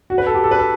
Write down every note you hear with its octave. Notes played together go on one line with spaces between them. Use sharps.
F#4
B4
A4
G4
A4
B4
A4